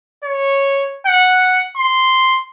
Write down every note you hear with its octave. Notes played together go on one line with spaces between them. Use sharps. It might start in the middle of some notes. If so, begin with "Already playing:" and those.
C#5
F#5
C6